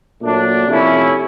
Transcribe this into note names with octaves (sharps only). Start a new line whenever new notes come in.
A#2 F#3 A3 D4
C3 F3 A3 C#4 E4